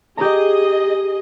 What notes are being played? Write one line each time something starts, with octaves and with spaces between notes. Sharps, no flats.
G4 G#4 D#5 A#5